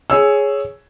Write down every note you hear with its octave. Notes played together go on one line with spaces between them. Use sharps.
G#4 C#5 E6